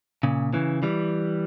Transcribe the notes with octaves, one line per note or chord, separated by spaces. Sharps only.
A#2 C#3
C#3 E3
E3 G3